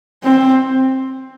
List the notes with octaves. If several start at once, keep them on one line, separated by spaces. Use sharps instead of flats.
C4